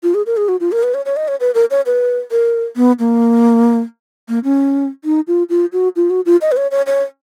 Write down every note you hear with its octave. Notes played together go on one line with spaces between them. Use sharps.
F4
G#4
A#4
G#4
F#4
F4
A#4
B4
C#5
C#5
D#5
C#5
B4
A#4
C#5
B4
A#4
B3
A#3
A#3
C#4
D#4
F4
F4
F#4
F4
F#4
F4
D#5
B4
C#5
C#5
C#5